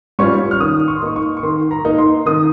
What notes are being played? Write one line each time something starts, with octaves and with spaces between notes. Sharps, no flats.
G3 C#4 F4 C#6
F6
D#3 D#6
C#6
C6
A#3 D#4 C#6
C#6
C#6
D#3 C6
A#5
A#3 D#4
C6
D#3 D#6